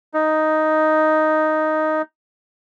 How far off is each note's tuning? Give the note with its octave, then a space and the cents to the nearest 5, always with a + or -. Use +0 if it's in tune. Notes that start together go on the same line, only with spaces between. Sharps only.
D#4 +0